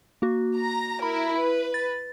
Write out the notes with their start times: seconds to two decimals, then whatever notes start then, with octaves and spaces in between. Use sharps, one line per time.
0.22 A#3 F#4
0.58 A#5 A#6
1.02 E4 A#4 B5
1.39 B4
1.74 A6